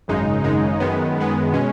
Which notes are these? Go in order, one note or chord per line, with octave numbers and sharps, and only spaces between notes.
G#1 F#2 C#3 G#3 D#4
G#1 F#2 C#3 G#3 D#4
F#2 D#3 G#3 B3
F#2 D#3 G#3 B3
B2 G#3 C#4